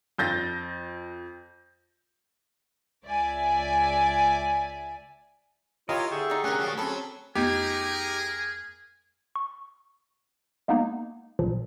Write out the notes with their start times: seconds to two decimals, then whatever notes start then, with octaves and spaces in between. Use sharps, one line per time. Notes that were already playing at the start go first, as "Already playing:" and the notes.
0.18 F2 G6 A6 A#6
3.05 C#2 D5 E5 G#5
5.89 E4 F4 G4 A#4 C#5 D#5 F5
6.11 D3 G#4 E5 G5 C#6
6.30 D#4 D5
6.44 C3 A3 C#4 G4 A#4 G#5 F#6
6.58 A#2 F3 F#3
6.77 F#3 C4 C#4 G#4 A4 B5
7.35 F2 A3 B3 D#4 G4 G#4 A#4 G#5
9.36 C#6
10.68 G#3 A#3 B3 D#4
11.39 A1 A#2 F3 F#3